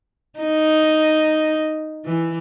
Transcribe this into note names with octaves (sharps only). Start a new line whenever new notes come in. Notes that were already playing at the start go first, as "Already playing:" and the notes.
D#4
E3